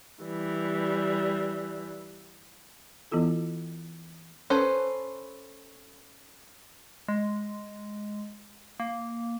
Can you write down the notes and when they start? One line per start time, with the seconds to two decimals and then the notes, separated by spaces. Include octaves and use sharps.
0.24 E3 G3
3.11 E3 B3 E4 F4 A4
4.50 C#4 A4 B4 C5
7.08 G#3
8.80 A#3